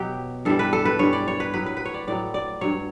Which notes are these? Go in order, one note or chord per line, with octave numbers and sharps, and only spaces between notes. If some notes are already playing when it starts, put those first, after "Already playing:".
Already playing: B2 F#3 G4
G2 E3 G3 A4
B4
A4
B4
G2 E3 G3 C#5
D5
C#5
B4
A2 F#3 B4
B4
B4
C#5
D5
A2 F#3 D5
D5
G2 F#3 C#5